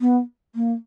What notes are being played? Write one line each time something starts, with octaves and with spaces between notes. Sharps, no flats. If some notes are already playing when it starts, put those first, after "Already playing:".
B3
A#3